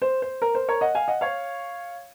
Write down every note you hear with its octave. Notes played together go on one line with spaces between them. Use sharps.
C5
C5
A#4
C5
A#4 C#5
D#5 F#5
F5 G#5
D#5 F#5
C#5 F5